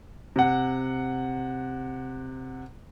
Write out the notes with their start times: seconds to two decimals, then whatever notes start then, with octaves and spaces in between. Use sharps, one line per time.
0.36 C3 F#5